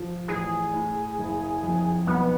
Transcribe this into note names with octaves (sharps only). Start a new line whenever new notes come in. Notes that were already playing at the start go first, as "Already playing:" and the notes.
Already playing: F3
A1 G#4
A2
F#1
F2
B1 B3